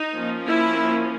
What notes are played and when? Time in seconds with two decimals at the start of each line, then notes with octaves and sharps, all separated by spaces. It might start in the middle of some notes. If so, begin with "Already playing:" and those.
Already playing: D#4
0.13 F3 A#3 C#4
0.46 E4